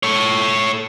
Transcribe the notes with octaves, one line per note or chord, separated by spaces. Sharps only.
A4 C#5